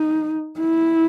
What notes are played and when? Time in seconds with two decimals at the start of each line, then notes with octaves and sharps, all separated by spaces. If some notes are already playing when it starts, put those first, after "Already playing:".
Already playing: D#4
0.60 E4